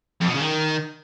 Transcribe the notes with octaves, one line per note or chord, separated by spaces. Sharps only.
F2
B2
C#3
D#3